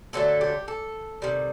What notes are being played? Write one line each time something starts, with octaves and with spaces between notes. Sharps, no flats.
D3 F#3 A3 A4
G4
A4
C3 D#3 G3